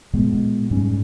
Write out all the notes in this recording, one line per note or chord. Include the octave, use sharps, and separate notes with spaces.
A#2 G#3 B3
G#2 G3 C#4